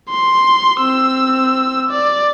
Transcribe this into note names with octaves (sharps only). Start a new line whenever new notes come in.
C6
C4 E6
D5